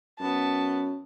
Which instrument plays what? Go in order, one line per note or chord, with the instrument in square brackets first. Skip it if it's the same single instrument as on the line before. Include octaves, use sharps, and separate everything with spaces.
[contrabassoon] F#2 [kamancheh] B3 A5